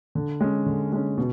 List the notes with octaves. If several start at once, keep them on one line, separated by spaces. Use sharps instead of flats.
D3
G#3 C#4
D3
G#3 C#4
B2